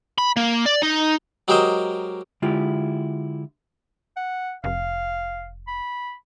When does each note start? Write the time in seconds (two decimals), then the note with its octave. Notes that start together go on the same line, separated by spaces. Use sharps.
0.18 B5
0.37 A#3
0.65 D5
0.82 D#4
1.48 F#3 G#3 G4 A#4 C5 D#5
2.42 D3 G#3 E4 F4 G4
4.16 F#5
4.64 F1 F5
5.67 B5